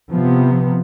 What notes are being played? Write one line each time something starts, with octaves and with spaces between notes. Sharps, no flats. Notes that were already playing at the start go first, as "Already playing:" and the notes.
C3 F3 B3